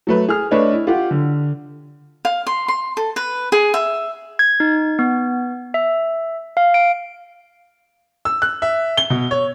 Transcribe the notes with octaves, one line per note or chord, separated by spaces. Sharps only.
F#3 A3 B4
G#4 F6
A3 D4 B4 C#5 D#5
E4
F4 G4 F#5
D3
F5
C6
C6
A4
B4
G#4
E5
G#6
D#4
B3
E5
F5
D7
E6
F#6
E5
G7
B2
C#5